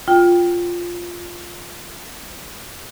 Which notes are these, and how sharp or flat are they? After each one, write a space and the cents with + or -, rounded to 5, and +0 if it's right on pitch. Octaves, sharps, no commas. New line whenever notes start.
F4 +0 G5 +0